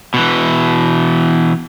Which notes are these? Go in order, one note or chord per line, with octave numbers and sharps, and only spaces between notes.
B2 E3